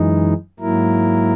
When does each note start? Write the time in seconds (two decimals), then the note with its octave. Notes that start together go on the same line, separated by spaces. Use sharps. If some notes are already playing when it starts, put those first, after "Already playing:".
Already playing: F#2 E3 G#3 D#4
0.59 G#2 F#3 A#3 E4 A#4